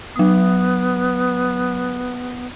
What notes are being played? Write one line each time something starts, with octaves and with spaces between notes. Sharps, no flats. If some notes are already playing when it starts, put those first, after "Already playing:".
F#3 B3 D#6